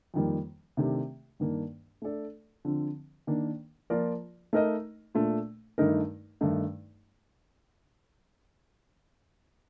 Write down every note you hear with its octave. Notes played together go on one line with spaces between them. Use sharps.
F2 D#3 G3 A#3
C3 D#3 A3 D4 G4
G2 D#3 A#3 D4
A3 D4 A4 D5
D3 F3 C4
D#3 A#3 D4
F3 A#3 F4 A#4 D5
A3 D#4 A#4 D#5
A#2 A3 D4
G2 D#3 A3 D#4 A#4
G2 D#3 A3 D#4